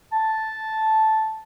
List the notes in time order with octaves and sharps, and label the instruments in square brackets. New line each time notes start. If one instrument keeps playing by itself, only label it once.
[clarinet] A5